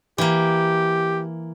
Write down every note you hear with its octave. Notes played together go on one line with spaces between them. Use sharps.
E3 A#3 G4